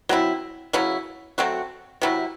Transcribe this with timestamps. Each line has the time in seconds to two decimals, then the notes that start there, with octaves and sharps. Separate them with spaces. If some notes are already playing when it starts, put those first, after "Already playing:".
0.09 F#3 C4 E4
0.73 C#3 F#3 C#4 E4
1.38 F#3 A3 C4 F#4
2.02 C3 F#3 C4 E4